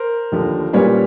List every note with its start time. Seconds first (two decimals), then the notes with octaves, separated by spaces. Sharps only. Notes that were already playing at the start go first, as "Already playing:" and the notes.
Already playing: A#4 C5
0.32 D#2 D3 F3 A3
0.73 A#2 G3 A#3 C#4 B4 C#5